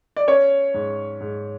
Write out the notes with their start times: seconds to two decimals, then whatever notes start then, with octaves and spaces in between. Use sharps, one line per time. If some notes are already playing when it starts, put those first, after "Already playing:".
0.16 D5
0.28 C#4 C#5
0.74 G#2
1.21 G#2